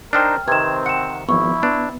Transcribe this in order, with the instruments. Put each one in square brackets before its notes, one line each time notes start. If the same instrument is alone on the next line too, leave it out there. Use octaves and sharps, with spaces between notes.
[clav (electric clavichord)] D4 D#4 C5 [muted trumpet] A#4 [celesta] G5 E6 F6
[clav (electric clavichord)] C3 D#3 [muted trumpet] C4 [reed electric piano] B4 [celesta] G#6 E7
[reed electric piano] F#5 [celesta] C#7 E7
[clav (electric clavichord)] G#1 [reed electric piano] F3 B3 [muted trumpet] E4 [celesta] C#6
[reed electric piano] B3 [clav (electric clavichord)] D4